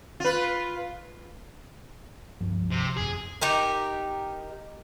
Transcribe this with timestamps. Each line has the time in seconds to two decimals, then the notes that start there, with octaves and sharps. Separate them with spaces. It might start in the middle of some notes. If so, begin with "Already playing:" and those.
0.20 F4 B4
2.41 C#2 G2 F3
2.71 C3
2.97 G#1 F2 G#4
3.41 D#4 G4 A#4